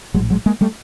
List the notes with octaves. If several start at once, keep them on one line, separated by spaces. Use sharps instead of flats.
A#1 A2 F#3 G#3
F#3 G#3
G#3 A#3
G3 A3